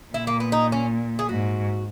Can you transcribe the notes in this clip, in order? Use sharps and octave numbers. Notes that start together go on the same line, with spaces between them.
A#2 E4
A#3
B3
D#4
C#4
G#4
G#2 F#4